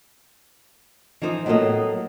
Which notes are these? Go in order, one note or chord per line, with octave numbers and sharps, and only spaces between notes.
E3 F3 D#4 C5 D#5
A2 F#3 A#3 B3 A4 D#5